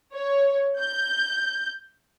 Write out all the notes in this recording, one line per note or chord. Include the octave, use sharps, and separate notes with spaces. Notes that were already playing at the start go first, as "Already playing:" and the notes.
C#5
G6